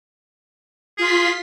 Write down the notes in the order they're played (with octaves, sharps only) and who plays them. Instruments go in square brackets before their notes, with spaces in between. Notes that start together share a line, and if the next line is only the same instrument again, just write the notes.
[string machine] F4 C6 B6 [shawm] G#4